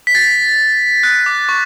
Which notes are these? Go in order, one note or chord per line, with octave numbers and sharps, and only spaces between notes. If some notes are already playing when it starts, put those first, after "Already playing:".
B6
A6
F#6
D6
C#6